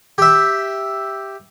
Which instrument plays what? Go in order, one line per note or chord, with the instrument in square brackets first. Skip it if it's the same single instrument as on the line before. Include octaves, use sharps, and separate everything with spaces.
[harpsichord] G4 E5